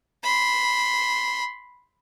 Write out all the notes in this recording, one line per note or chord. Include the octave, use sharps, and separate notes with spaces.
B5 C6